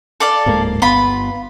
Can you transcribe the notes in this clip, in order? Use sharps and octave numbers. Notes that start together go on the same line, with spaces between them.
A4 D5 F5
D1 G#2 A#3
G1 B3 F4 B5